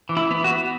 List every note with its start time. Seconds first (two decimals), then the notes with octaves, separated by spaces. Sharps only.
0.09 E3
0.17 E4
0.31 B3
0.44 F#4
0.51 B3